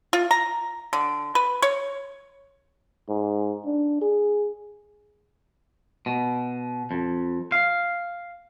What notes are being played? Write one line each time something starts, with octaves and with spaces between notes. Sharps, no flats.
F4
A#5
D3
B4
C#5
G#2
D4
G#4
B2
F2
F5